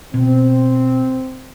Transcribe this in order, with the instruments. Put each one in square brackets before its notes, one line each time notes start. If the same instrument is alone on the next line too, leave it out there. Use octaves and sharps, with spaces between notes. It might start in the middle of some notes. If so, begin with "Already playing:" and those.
[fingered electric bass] B2 [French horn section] C4